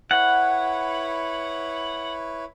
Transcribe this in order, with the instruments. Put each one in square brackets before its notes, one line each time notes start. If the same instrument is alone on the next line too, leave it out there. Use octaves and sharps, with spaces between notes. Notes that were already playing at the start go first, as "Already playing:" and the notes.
[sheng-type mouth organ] E4 B4 C#5 [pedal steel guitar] F#5